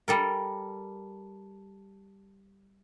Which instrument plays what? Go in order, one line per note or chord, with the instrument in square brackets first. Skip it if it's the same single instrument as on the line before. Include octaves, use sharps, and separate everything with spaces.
[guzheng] G3 A4 A#4